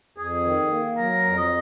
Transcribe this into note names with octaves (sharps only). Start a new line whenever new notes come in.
F2 G#4
D#3
A#3
F#3 A#4
F2
D#5